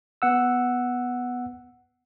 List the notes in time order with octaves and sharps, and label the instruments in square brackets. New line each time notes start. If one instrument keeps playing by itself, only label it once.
[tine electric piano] B3 F#5 E6